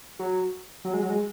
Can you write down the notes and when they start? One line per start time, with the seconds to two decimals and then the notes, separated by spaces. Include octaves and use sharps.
0.19 F#3
0.85 F#3
0.94 G#3
1.02 F#3
1.10 G#3